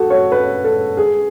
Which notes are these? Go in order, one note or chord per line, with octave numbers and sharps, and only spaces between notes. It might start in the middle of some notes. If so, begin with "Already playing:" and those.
Already playing: F#4 A4
C#5
B4
A4
G#4